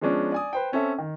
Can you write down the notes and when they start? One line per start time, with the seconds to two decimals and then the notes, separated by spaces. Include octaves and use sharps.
0.01 F3 G#3 B3 C#4 D4
0.32 D5 G#5 D#6
0.53 B4 C5 G5
0.72 C4 C#4 A4 E5
0.98 D#3